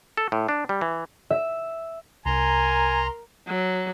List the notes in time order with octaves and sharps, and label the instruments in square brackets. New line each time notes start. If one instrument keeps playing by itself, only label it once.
[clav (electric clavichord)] A4
A2
D4
G3
E3
[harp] E5
[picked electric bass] C2 [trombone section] A#4 [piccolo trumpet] G#5 [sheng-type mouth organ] A#5 C6
[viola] F#3